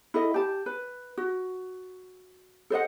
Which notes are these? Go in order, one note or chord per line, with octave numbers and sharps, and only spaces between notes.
E4 A4 D#5
G4 A5
B4
F#4
A4 C5 D#5 F#5